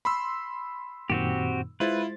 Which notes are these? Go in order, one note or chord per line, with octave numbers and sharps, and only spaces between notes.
B5 C6 E6
F#2 A#2 D#3 C4 F#4 G4
G#3 E4 F4 B4 C5 A6